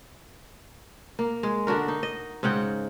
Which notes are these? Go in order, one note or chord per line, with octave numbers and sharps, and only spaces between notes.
A#3
G#3
D3 D4 F#4 A#4
D#4
D#5
G#2 C#3 F#5 G5